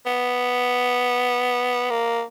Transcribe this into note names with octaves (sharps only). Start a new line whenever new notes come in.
B3
A#3